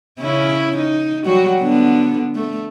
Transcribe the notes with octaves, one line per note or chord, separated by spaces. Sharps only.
C#3 C#4 E4
D#4
F#3 G3 F#4
D3 B3 D4
A3